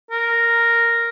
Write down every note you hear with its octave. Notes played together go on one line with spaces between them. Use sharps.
A#4